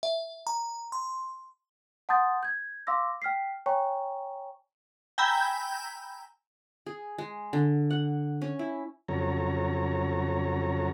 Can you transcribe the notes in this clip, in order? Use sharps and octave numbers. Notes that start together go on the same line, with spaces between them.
E5
A#5
C6
F#5 A5 C6 D#6 G6 A6
G6 G#6
F5 C6 D6 E6 A#6
G5 F6 B6 C7
C#5 G5 G#5 A#5 C#6
G5 G#5 A#5 B5 E6 G6
G#4
G#3
D3
F#5
C#4
E4
F2 C#3 F#3 A4 C#5 A#5